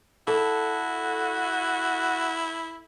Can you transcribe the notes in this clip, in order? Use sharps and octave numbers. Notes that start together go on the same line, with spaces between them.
E4 F#4 A4